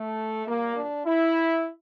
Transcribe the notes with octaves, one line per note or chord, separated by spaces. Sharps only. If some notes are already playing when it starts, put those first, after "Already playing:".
Already playing: A3
A#2 G3 A#3
D4
E4